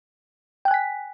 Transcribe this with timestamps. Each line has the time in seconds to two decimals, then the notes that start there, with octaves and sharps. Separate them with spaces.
0.65 G5
0.68 F#6
0.71 G#5
0.74 B6